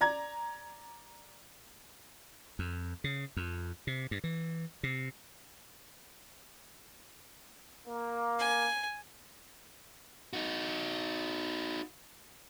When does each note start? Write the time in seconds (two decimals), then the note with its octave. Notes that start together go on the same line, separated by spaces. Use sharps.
0.01 D5 A#5 G#6
2.59 F2
3.04 C#3
3.37 F2
3.87 C3
4.11 G2
4.24 E3
4.83 C3
7.87 A#3
8.39 G#5
10.33 D#4 F#4